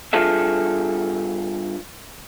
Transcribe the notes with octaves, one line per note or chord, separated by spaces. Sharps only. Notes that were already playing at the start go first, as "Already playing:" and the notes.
G2 F4 G#4 A4 E5